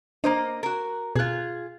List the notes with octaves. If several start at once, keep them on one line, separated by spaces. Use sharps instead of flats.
A#3 D4 C5 D#5
F#4 A#4
B2 F4 G#4 F#6